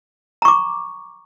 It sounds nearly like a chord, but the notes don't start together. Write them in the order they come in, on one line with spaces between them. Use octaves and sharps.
A#5 C#6 D6